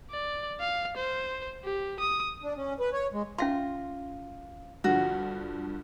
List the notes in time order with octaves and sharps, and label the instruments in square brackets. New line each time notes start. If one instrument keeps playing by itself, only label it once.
[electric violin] D5
F5
C5
G4
D#6
[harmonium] D4
C#4
B4
C#5
G#3
[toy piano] C#4 E5 C6 [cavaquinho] F4
[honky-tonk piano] G2 D3 F3 [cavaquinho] F#4